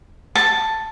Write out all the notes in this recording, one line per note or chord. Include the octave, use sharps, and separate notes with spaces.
A5